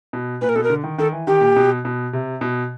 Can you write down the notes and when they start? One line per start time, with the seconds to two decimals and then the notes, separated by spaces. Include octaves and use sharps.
0.13 B2
0.41 A#2 B4
0.49 A#4
0.56 B2 A4
0.64 A#4
0.70 D3
0.84 D#3
0.98 D#3 A4
1.12 E3
1.27 D#3 G4
1.41 A#2
1.56 B2
1.85 B2
2.13 C3
2.41 B2